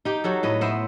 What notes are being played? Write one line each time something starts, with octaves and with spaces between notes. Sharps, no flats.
D#4 G4
F#3 F#4 A4
A2 B4 D#5
B3 C5 E5